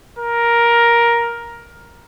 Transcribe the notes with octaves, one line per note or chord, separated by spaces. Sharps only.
A#4